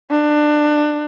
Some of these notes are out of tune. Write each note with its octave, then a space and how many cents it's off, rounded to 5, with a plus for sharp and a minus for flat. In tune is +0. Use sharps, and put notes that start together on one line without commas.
D4 +20